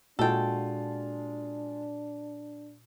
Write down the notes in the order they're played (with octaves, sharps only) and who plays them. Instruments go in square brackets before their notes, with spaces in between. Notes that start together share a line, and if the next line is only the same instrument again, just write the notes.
[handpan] A#2 F#4 [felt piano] G#3 F4 [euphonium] D4 [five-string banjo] A4 G5